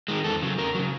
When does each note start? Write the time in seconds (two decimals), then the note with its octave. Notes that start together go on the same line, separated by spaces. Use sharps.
0.08 D#3 G#3
0.24 E2 A4
0.42 C#3 F#3
0.58 E2 A#4
0.75 C#3 F#3